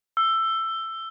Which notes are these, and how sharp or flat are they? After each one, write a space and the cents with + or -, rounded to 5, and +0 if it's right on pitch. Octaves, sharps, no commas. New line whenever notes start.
E6 +15